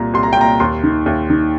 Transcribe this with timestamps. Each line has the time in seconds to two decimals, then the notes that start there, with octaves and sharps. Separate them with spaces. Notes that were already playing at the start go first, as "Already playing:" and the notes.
Already playing: C2 A#2 A#5
0.14 C2 C6
0.23 A#5
0.33 G5
0.37 A#2 A#5
0.60 D#2 C6
0.83 D#3
1.06 D#2
1.30 D#3